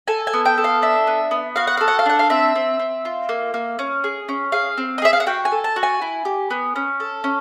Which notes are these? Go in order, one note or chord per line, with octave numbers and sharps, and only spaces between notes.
A4 G#5
G#5
B3
G5
A4
F5
D4 E5
B3
B3
F#4 F5
F#5
A4 F5
F#5
F5
D4 F#5
F5
C4 E5
C4
C4
F4
A#3
A#3
C#4
G#4
C#4
G#4 F5
C4
D#5
G#4 E5
F5
F#5
F#4 G5
G#5
A4
A5
F#4
G#5
E4
G4
B3
C#4
A4
C#4